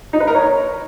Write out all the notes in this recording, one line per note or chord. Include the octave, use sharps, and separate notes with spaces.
D#4
B4
A#4
C#5